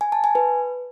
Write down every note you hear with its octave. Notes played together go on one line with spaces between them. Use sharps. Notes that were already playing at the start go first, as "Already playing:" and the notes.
G#5
A5
G#5
B4